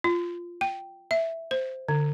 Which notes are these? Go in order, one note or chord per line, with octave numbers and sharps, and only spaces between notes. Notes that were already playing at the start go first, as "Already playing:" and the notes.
F4
G5
E5
C5
D3